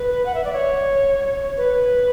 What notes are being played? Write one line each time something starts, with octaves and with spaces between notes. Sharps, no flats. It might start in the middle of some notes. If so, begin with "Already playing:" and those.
Already playing: B4
F#5
E5
D5
C#5
B4